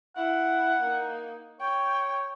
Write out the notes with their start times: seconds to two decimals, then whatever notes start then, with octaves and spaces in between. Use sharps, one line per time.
0.17 E4 F#5
0.82 A#3 D#4
1.61 C#5 G5